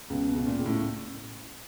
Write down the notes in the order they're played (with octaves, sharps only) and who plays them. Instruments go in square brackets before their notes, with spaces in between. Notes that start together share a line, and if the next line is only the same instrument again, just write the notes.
[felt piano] C#2 [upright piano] B2
[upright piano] B2
[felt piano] C#2
[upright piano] A#2
[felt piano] C#2
[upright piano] A2